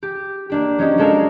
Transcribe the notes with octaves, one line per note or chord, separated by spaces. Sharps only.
G4
A#3 D4 G4
F#3 C#4 D#4 G4
F#3 G#3 A4 A#4 D5 F5